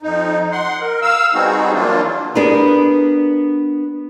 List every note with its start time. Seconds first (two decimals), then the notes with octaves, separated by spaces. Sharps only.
0.03 F2 D#4
0.52 F#5 C6
0.81 A#4
1.02 F5 E6
1.34 G3 B3 C4 D#4 F#4 G#4
1.73 E3 F#3 A#3 D4 F4
2.35 B3 D4 G4 G#4 A#4 B4